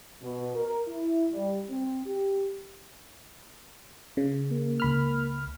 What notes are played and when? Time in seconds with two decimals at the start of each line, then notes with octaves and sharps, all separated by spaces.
0.22 B2
0.55 A#4
0.88 E4
1.32 G3
1.69 C4
2.05 G4
4.17 C#3
4.51 A#3
4.80 C#2 B5 F6